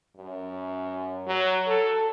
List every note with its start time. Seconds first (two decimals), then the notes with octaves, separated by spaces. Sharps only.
0.17 F#2
1.27 F#3
1.67 A4